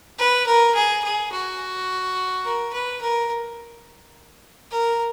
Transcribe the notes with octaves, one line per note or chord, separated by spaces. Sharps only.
B4
A#4
G#4
G#4
F#4
A#4
B4
A#4
A#4